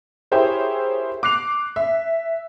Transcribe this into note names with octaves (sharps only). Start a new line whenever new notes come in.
E4 G4 G#4 A#4 C5 C#5
D6 F#6 C7 F7
E5